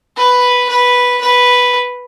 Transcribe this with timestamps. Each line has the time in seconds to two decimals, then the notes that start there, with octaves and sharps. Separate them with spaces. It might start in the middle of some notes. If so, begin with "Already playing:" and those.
0.17 B4
0.69 B4
1.21 B4